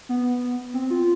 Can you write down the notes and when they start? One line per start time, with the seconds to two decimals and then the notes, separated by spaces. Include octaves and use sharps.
0.09 B3
0.74 C4
0.91 F4